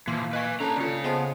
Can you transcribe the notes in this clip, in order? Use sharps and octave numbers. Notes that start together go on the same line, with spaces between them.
A#2 E3 F3 A#3 C6
B4 D#5 F5 G#5 C#6
C#4 D4 A4 A5 A#5
C#3 C#4 F4 C#5 D5
B3 G#4 C5 D#5 G#5 A5 C6